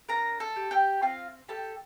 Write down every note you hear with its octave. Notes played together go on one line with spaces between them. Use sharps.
D4 A#4 A#5
A4 A5
G4
G4 G5
C4 F4 F5
G4 A4 A5